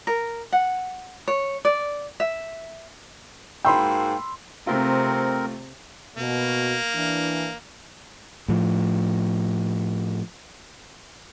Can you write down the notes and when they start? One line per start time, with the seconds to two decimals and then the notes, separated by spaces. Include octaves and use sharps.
0.07 A#4
0.52 F#5
1.28 C#5
1.65 D5
2.20 E5
3.65 G#2 A#3 F#4 G5 B5 C6 E6
4.67 C3 A3 C4 F4 A#4
6.17 B2 A#3
6.95 E3 D4
8.48 A2 F3